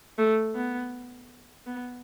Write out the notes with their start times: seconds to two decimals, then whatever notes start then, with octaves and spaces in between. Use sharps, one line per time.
0.18 A3
0.55 B3
1.67 B3